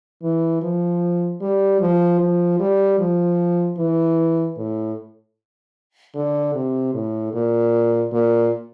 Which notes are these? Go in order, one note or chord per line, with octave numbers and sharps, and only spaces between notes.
E3
F3
G3
F3
F3
G3
F3
E3
A2
D3
C3
A2
A#2
A#2